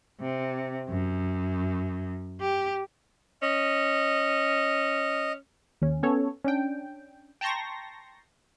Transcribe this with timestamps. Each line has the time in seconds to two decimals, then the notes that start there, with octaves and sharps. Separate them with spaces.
0.20 C3
0.89 F#2
2.41 G4
3.42 C#4 D#5
5.82 D#2 C#4
6.03 B3 C#4 A4 C#5
6.45 C#4 D4 G5
7.41 G5 A5 A#5 C6 C#6 A#6